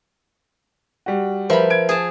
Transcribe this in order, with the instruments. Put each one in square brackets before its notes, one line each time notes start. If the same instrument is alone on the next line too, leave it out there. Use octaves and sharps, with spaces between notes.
[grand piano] G3 F#4
[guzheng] F3 B5 [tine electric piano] A#4 B4 E5
[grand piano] G#6 D7
[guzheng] G#4 A5